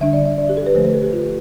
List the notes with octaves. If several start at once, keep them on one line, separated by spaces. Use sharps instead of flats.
D3 G3 D4 E5
D5
E5
D5
G4
A4
B4
D3 F3 A3 C5
B4
A4
G4
F4